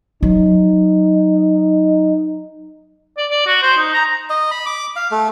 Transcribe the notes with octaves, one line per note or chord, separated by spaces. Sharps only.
F#3 D#4
D5
D5
F#4
C5
D#4
A#5
D#5
B5
D6
F5
A3